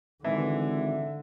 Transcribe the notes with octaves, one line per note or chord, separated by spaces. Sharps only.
G#1 D3 E3 E5